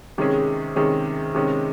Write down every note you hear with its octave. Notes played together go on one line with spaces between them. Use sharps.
C3 D#3 G#3 C#4 G#4
C3 D#3 G#3 C#4 G#4
C3 D#3 G#3 C#4